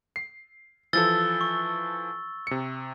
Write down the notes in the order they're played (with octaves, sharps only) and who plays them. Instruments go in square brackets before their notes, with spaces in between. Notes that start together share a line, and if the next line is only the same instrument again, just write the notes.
[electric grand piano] C7
[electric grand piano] E3 F3 A4 [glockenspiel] E6 A6 G7
[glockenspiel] C#6
[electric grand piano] C3 C#7